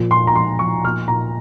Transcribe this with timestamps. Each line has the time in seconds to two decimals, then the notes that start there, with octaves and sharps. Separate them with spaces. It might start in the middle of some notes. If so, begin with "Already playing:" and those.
Already playing: A#2 F3
0.11 A#2 C6
0.27 A#5
0.35 F3 C6
0.59 F3 C#6
0.84 A#2 F6
1.08 A#2 A#5